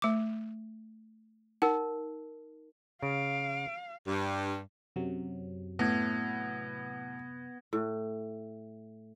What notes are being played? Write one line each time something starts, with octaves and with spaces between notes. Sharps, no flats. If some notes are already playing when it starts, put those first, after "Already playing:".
A3 D6
D#4 A#4 F#5
C#3 F5 D7
G2
F#2 C3 F#3
A2 B3 G#6 A#6
A2